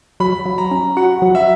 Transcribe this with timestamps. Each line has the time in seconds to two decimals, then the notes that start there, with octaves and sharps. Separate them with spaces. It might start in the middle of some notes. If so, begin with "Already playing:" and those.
0.20 F#3 B5
0.46 F#3
0.58 A#5
0.71 C#4
0.97 F#4 F#5
1.22 F#3
1.35 E5